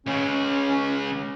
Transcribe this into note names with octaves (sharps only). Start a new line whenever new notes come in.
C#2 C#3 C#4